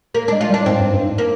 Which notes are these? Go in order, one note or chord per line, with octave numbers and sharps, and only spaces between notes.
A#3
G#3 D4
F4
G3
D4
G#2 C4
G2
G2
G#2
A#3